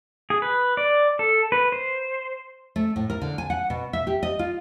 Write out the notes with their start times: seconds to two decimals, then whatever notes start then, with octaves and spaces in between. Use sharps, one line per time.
0.30 G#4
0.42 B4
0.77 D5
1.19 A4
1.52 B4
1.72 C5
2.76 A3
2.96 A2
3.10 A#4
3.22 D3
3.38 G#5
3.50 F#5
3.70 B2
3.93 E5
4.07 G4
4.23 D#5
4.39 F4